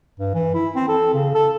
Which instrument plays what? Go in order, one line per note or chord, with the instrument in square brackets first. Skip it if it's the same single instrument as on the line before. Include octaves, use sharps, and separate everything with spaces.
[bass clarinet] G2
E3
E4
C4
A4
C#3
A4